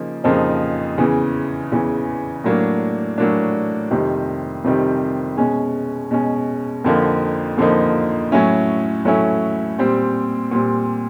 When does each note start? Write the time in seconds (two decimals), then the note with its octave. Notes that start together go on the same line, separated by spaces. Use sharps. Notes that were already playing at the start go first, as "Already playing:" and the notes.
Already playing: C#3 F3 A#3 D#4
0.24 F2 C#3 F3 A#3 D#4
0.98 E2 C#3 E3
1.72 E2 C#3 E3
2.44 A2 F#3 A#3 D4
3.18 A2 F#3 A#3 D4
3.91 F2 C3 D#3 G3
4.64 F2 C3 D#3 G3
5.37 B2 G#3 C#4
6.11 B2 G#3 C#4
6.84 F2 D3 F3 A#3 D#4
7.58 F2 D3 F3 A#3 D#4
8.32 A2 F#3 A3 C#4 E4
9.05 A2 F#3 A3 C#4 E4
9.78 A#2 G3 C4
10.51 A#2 G3 C4